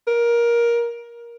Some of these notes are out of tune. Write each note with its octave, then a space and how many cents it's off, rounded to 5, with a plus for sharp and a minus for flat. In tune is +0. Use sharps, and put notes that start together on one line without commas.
A#4 +15